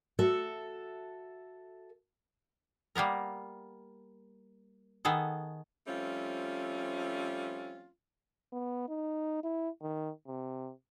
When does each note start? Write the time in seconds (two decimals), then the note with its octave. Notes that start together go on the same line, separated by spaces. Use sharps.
0.19 F#4 A4 E5
2.95 G3 A#3 B3 A#4
5.05 D#3 B3 G#4 A4
5.87 F3 G3 A3 C4 C#4 F4
8.52 B3
8.88 D#4
9.43 E4
9.82 D#3
10.28 C3